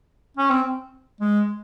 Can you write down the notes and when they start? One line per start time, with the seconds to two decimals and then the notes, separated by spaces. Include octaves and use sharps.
0.37 C#4
0.50 C4
1.21 G#3